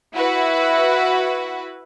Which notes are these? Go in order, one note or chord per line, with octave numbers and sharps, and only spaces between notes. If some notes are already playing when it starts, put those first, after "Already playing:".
E4 F#4 B4